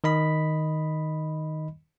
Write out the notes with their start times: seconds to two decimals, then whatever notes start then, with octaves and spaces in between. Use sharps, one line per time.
0.04 D#3 D#5 B5 B6